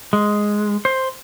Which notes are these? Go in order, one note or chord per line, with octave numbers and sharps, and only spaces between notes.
G#3
C5